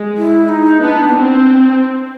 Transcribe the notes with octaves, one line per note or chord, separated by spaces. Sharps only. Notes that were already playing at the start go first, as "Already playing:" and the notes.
Already playing: G#3
E4
D#4
B3 D4
C4